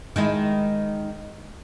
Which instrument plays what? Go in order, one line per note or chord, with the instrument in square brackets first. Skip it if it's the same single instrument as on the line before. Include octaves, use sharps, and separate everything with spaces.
[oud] D#3 G#3 E4